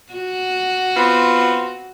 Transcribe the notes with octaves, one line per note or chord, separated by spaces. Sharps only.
F#4
B3 C4 F4